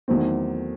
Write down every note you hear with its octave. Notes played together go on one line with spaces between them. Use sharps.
E2 D#3 F#3 A3 C4